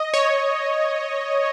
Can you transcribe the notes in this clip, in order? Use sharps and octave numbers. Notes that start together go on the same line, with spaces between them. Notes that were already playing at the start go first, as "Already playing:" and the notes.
Already playing: D#5
C#5